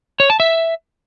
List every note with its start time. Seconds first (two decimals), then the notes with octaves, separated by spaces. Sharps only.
0.20 C#5
0.30 A5
0.40 E5